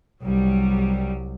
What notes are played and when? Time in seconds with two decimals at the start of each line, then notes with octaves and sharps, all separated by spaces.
0.22 C2 F#3 G3